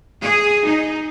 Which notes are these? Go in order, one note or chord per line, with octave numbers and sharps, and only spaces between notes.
G#4
D#4